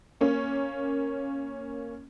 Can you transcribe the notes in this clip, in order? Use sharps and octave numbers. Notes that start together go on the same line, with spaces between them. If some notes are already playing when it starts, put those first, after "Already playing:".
A#3 C#4